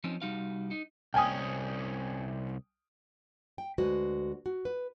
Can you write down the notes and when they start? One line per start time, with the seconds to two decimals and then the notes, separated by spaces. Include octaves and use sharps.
0.04 F3 C4 C#4 D#4
0.22 C2 G3 D#4 F#4 F5
0.71 D#4
1.14 C2 C#4 G5 G#5 D#6
3.58 G5
3.78 D2 G#3 F#4 B4 C5
4.46 F#4
4.65 B4